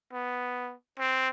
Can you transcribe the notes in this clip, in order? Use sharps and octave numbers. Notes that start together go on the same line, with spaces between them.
B3
C4